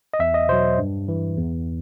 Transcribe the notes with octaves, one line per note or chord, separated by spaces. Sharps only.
D#5
E2 E5
D#5
B2 F#3 C5
G2
E3
E2